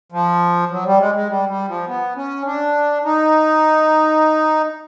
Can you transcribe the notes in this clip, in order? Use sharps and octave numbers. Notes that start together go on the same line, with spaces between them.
F3
F#3
G3
G#3
G#3
G3
G3
F3
B3
C#4
D4
D#4